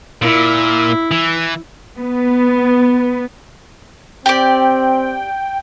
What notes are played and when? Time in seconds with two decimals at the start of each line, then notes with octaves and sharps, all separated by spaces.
0.22 A#2 E4
1.11 E3
2.00 B3
4.26 C4 G4 D5 G5